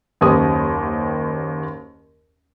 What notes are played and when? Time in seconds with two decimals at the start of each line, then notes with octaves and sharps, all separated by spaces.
0.21 F#1 D#2 G4 D#6